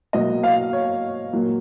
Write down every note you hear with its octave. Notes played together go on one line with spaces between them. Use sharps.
B2 F#3 A#3 D#5
F5
C#5
A#2 F#3 A#3